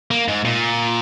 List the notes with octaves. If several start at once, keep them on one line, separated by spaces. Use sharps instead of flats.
A#3
G#2
A#2